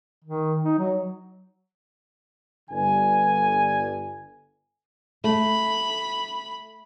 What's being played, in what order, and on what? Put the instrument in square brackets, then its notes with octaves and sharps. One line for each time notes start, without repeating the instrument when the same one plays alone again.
[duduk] D#3
D#4
F#3
[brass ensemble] G1 G2 D3 G#5
[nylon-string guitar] A3 [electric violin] B5